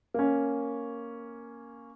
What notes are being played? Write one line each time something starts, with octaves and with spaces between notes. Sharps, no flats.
A#3 C#4